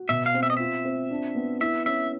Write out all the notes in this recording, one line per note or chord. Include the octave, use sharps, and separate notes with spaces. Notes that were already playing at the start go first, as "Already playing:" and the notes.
Already playing: F#4
B2 E5
F5
C4
E5
D#5
F4 E5
C4
D4
B3
E4 E5
C#4 E5